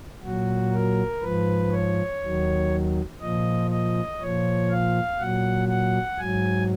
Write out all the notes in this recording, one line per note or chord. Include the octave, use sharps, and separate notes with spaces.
A#2 F#3 F#4
A#4
G#2 F3 B4
C#5
D#2 D#3 F#3
A#2 F3 D#5
D#5
A#2 F3 C#5
F5
A#2 F#3 F#5
F#5
G#2 F#3 G#5